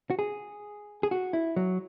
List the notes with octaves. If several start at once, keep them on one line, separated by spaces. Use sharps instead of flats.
F#4
G#4
G#4
F#4
E4
F#3